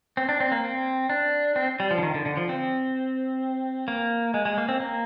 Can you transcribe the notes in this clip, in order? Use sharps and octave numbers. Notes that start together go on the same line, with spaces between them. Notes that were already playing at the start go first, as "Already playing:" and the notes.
C4
D4
C4
A#3
C4
D4
C4
G3
F3
D3
D#3
D3
D3
F3
C4
A#3
G#3
G#3
A#3
C4
A#3